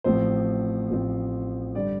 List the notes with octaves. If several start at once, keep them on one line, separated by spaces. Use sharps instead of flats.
A1 A2 F3 C4 C5
A1 A2 F3 C4
G2 D3 G3 D5